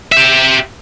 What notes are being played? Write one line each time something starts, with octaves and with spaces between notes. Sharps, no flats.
G4 E5